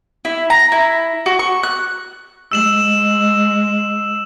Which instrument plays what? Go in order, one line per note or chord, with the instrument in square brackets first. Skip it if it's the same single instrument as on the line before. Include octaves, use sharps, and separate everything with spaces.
[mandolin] E4
A#5
E4
F#4
C#6
F#6
[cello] G#3 [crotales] E6 E7 F#7